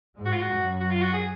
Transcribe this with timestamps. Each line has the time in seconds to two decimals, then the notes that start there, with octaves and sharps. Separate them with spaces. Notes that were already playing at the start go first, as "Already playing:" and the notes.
0.16 G#2 G#3
0.25 F#4
0.33 F4
0.41 F#4
0.48 F#2 F#3
0.80 F#4
0.91 F4
1.02 F#4
1.13 G#4